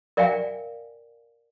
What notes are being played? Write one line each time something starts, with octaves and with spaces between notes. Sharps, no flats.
A#4 D5 E5 F5 G5 G#5